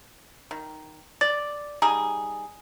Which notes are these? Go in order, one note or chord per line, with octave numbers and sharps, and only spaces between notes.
D#3
D5 A6
G3 D#4 G#4 A#5